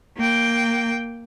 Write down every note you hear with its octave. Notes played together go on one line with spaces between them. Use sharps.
A#3 G5